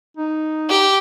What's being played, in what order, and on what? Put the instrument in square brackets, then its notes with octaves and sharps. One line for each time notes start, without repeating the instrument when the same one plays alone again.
[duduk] D#4
[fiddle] G4